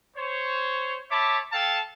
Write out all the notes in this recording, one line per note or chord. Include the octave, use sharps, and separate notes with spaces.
C5 C#5
C#5 E5 A5 B5 D6
A4 F5 G5 A5